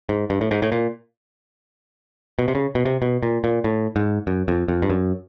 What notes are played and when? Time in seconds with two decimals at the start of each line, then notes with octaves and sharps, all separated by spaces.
0.09 G#2
0.30 G2
0.41 A2
0.51 G#2
0.62 A2
0.72 A#2
2.39 B2
2.48 C3
2.55 C#3
2.75 B2
2.85 C3
3.02 B2
3.23 A#2
3.44 A#2
3.64 A2
3.96 G#2
4.27 F#2
4.48 F2
4.68 F2
4.82 G2
4.90 F#2